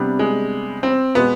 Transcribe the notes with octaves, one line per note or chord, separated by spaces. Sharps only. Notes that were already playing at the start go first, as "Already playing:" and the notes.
Already playing: C3 G3 B3 D4
G#3
C4
B2 G#3 B3